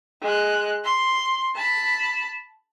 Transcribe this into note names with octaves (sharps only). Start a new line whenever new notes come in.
G#3 F#6
C6
A5 B5